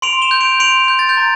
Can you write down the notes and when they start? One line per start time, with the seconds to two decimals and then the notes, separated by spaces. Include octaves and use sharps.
0.02 C6 D7 F7
0.22 E7 G7
0.31 G6
0.41 D7 F7
0.60 C6 D7 F7
0.88 G6
0.99 A6
1.09 G6
1.17 A#5